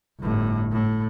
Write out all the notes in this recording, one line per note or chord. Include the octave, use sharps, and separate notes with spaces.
G1 A2
A2